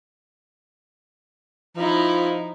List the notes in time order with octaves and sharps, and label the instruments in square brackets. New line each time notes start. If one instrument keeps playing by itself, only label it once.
[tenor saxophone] F3 [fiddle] D#4 E4